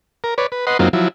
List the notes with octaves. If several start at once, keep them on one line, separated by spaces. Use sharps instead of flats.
A#4
B4 C#5 D5
B4
B4 D#5 F#5 C6
F#2 F#3 A#3 C4 D#4 F4
F3 F#3 E4